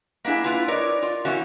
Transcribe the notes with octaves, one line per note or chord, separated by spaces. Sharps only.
A#3 B3 D4 E4 G#4
E4 F4 B4
D#4 A#4 C#5 D5
F4
B2 E3 A#3 C#4 F#4